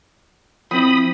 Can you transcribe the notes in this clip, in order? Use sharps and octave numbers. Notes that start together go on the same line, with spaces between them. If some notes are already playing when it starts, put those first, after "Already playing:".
F3 C4 E4 B5 D#6